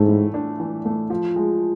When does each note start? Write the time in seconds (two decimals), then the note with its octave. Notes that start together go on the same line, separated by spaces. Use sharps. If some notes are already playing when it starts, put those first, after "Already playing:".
Already playing: G#2 E3 A3
0.08 A2
0.34 D4
0.60 E3
0.85 A3
1.10 F3
1.36 G#3